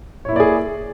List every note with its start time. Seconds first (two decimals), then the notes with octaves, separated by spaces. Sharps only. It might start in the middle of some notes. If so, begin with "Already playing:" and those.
0.25 C#5
0.29 E4
0.32 A#3
0.36 D5
0.40 G#4